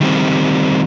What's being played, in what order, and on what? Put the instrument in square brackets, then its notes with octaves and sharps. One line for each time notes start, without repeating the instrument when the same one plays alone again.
[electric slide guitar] D#3 G3 C4